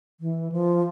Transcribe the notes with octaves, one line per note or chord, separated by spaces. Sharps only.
E3
F3